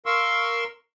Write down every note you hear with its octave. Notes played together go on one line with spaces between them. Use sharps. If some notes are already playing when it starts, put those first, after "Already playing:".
A#4 F5 C6 C#6 E6